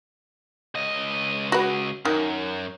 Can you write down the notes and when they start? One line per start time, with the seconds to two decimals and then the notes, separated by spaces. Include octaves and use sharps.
0.75 C#2 D#5
1.52 F#4 B4
2.05 F#2 D#3